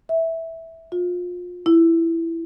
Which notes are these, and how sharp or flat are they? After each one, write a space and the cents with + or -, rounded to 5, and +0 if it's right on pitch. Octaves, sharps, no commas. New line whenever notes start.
E5 -10
F4 +30
E4 +10